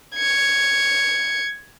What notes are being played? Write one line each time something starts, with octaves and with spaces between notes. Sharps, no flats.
G#6 C#7